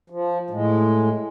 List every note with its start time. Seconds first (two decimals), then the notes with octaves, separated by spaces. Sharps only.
0.10 F3
0.50 A2 G#3